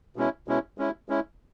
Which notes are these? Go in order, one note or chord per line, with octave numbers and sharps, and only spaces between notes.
B2 G#3 C#4 E4
B2 G#3 C#4 E4
G#3 C#4 E4
G#3 C#4 E4